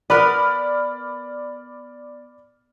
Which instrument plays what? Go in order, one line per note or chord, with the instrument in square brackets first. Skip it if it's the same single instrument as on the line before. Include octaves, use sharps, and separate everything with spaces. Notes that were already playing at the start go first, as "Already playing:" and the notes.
[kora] B3 A#4 B4 [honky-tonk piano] D5 B5 F6